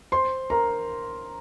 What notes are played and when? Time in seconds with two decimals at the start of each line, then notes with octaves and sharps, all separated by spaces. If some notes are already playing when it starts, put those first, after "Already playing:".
0.12 C5 C6
0.50 A#4 A#5